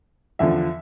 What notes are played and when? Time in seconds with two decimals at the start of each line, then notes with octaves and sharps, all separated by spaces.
0.39 E2 D3 F3 E5